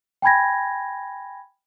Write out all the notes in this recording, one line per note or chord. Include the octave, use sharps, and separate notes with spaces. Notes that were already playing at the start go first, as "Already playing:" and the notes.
G5 G#5 B5 G#6 A#6